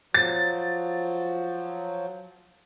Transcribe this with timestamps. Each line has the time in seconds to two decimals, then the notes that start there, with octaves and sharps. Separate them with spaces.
0.14 F3 F#3 A6